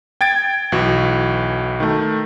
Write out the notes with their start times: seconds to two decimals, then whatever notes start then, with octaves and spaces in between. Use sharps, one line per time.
0.21 G5 G#6 A6 D7
0.72 B1 E3 F#4
1.80 D#3 A3